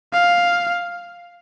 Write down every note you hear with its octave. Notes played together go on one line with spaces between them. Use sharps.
F5